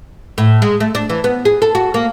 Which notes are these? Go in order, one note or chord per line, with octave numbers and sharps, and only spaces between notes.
A2
G#3
A3
D4
E3
B3
G#4
A4
F#4
A#3